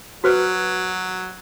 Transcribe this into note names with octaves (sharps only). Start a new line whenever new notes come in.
F#3 F#4 B4 C5